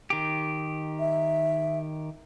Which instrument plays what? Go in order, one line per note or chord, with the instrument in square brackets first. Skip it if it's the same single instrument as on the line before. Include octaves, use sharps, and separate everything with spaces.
[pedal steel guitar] D#3 G4
[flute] E5